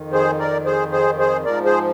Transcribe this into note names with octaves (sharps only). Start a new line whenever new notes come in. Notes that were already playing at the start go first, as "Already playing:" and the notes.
Already playing: F2 D#3
G#4 C5
A#4 D5
G#4 C5
G#4 C5
G#4 C5
G#2 F3 A#4 D5
G#4 C5